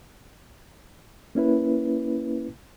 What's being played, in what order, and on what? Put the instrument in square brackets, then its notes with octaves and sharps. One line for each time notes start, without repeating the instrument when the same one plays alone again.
[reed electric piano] A#3 C#4 E4 B4